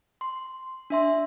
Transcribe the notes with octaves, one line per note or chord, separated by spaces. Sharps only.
C6
D4 E5 C6